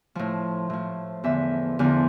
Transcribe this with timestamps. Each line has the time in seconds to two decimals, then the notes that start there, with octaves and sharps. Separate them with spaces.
0.15 A2 F3
0.70 A2 F3
1.24 E2 D3 F3 E5
1.79 E2 D3 F3